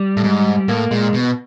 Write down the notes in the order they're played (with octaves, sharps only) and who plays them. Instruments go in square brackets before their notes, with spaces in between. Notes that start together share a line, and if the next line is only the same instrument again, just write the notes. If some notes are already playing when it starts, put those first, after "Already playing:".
Already playing: [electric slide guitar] G3
[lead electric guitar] A2
G#2
[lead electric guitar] A2 [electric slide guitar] A#3
[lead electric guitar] A#2 [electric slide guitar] G#3
[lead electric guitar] B2